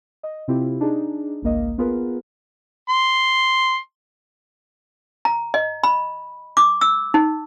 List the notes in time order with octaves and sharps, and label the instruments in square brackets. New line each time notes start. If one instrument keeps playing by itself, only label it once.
[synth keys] D#5
C3 C4 E4 F4 G4
D4 D#4 G#4
G#1 C#2 A#3 D#5
B3 F4 G#4 A#4 B4
[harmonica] C6
[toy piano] A#5
D#5
B5
D6
E6
D#4